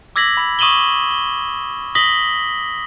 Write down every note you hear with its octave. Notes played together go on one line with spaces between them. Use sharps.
D6 E6 G#6 A#6 B6 F#7
B5 A#6
C#6 D#6 D#7 E7 F#7 G7
G7
D#6 A#6 B6 F#7 G7